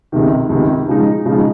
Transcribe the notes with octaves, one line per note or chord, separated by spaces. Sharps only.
C#2 C3 D#3
C#2 C3 D#3
C#3 F3 G#3 D#4
C#3 F3 G#3 D#4